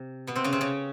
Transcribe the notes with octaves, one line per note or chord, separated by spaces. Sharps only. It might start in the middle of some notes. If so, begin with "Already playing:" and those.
Already playing: C3
B2 B3
C3 C4
C#3 C#4
C3 C4
C#3 C#4